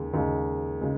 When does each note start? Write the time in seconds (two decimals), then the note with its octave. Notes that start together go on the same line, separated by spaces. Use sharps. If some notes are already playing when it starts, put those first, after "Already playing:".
Already playing: D#2 C#3 G#3
0.13 D#2 C#3 G#3
0.81 C#3 G#3